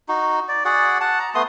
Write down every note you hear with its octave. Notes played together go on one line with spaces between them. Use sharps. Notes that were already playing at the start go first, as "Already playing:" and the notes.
D#4 F#4
D5
F#4 G#4 D5 F#5
F#5 A5
A#5
A3 B3 C6 D#6